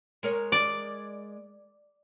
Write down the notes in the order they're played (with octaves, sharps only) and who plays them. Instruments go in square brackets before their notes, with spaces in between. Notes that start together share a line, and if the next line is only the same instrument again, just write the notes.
[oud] G#3 A#4 C#5
[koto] D5